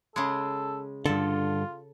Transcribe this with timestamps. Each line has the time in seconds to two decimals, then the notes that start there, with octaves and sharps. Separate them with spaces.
0.16 C#3 G#3 A4
1.06 G2 D3 F4 A4